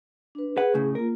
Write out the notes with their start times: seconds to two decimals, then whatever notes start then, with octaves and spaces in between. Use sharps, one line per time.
0.35 D4 B4
0.57 G#4 B4 F#5
0.74 A2 C#3
0.95 A#3 F4 A#4